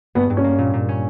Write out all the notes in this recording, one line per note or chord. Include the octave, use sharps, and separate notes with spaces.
G2 B3
G2
C#4
A#3
A#2
A#2
C#4